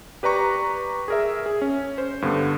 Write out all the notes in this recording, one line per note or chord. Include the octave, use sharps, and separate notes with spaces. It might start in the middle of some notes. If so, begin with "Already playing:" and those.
G4 B4 D5 A#5 C#6
G#4 A#4 E5
G#4
C#4
C5
G2 D3 B3